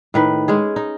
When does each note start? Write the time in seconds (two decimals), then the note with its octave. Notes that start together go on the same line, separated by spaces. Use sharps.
0.14 A2 D#3 B4
0.48 G#3 C#4 G#4
0.76 D#4